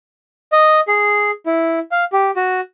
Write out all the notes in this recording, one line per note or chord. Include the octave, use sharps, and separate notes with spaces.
D#5
G#4
E4
F5
G4
F#4